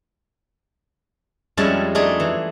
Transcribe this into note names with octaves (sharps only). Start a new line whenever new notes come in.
F2 G3 G#3 C#4 E4 A5
G#3 A3 D4 D#4 G#4
E3